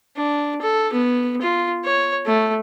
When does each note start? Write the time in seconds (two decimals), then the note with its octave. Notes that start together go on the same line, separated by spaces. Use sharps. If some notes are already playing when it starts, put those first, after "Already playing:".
0.16 D4
0.61 A4
0.93 B3
1.41 F4
1.85 C#5
2.26 A3